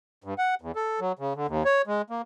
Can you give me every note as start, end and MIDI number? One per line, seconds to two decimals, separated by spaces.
0.24 0.34 43
0.38 0.55 78
0.61 0.72 40
0.76 1.00 69
1.00 1.12 54
1.19 1.33 49
1.36 1.47 50
1.48 1.63 39
1.65 1.82 73
1.87 2.02 56
2.10 2.22 58